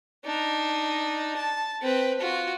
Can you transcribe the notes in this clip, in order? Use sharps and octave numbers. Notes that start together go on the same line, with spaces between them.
D4 D#4
A5
C4 B4
F4 F#4